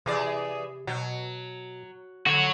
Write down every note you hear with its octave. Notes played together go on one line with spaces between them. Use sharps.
C3 E3 G#4 D5
B2 F#3
D3 F#4 C#5